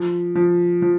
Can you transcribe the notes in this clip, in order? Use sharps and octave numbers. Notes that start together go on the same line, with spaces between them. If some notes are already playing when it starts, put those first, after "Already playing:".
Already playing: F3
F3
F3